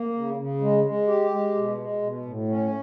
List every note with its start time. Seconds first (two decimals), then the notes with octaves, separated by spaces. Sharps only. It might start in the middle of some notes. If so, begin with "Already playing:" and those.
Already playing: A#3
0.13 C#3
0.36 C#3
0.61 G#3
0.84 G#3
1.07 G4
1.31 G#3
1.55 B2
1.77 G#3
2.02 B2
2.25 A2
2.48 C#4